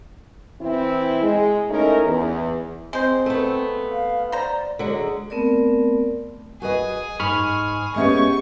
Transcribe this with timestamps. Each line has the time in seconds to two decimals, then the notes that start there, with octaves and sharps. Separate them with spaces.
0.61 E3 C4 E4
1.23 G#3
1.69 A3 C#4 D#4 E4 A#4
2.05 E2
2.93 G#3 C4 C5
3.26 A3 B3
3.91 F5
4.32 C5 D5 A#5
4.79 D3 F#3 G#3
5.30 A3 B3 C4 A#4 D5
6.62 F#4 G#4 B4 D#5
7.20 G#2 G#5 B5 C#6 F6
7.96 G#3 A3 B3 C#4 G4 C#6